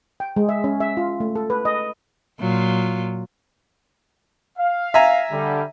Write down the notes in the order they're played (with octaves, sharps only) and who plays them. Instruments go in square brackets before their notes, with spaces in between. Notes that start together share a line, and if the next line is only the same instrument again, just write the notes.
[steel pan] G5
G#3
E5
C#4
E5
F4
A3
A4
B4
D#5
[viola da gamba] A#2 F#3 F4
[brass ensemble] F5
[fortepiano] E5 G#5 A#5
[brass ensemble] D3 G3